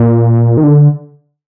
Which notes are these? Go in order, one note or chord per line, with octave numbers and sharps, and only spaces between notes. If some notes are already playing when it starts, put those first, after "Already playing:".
Already playing: A#2
D#3
D3